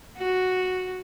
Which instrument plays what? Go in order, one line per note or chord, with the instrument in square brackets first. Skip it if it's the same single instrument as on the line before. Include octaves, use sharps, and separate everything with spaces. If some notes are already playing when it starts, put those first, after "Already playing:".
[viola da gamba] F#4